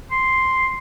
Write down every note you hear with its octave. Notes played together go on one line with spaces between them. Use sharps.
C6